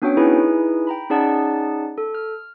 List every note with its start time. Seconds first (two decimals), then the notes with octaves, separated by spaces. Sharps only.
0.02 B3 C#4 D4 F#4 C#5 G5
0.17 D#4 E4 G#4 B4 G#5
0.87 G5 A#5 B5
1.10 C#4 D#4 G#4 D5 F#5 A5
1.98 A4
2.15 F6